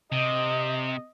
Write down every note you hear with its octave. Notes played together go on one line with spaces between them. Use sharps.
C3 D#5